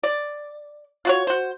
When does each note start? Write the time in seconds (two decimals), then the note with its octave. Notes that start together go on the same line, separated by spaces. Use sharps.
0.03 D5
1.05 F4 F#4 C#5
1.27 F#4 C5